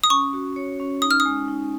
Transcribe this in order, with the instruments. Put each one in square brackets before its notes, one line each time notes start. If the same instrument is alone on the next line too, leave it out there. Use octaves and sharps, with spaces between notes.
[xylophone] D#6
[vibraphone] C#4 [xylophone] C#6
[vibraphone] F#4
C#5
C#4
[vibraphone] D#4 [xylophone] D#6
[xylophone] F6
D#6
[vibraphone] G#3
D#4